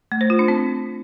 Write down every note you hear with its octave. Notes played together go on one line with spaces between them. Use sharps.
A3
C5
F4
D4
C4